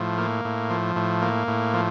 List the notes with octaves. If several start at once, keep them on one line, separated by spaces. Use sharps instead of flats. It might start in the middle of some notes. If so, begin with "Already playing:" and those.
Already playing: A2 F3
A#3
A2
F3
A2
A#3
A2
F3